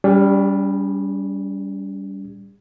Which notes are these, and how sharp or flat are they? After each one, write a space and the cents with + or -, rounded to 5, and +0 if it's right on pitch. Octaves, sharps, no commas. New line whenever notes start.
G3 +0 C#4 +45 G#4 -40